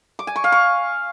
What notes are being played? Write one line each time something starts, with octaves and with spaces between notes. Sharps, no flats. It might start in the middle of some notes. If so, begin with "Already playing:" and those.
D6
G#5
C#6
F5
C#6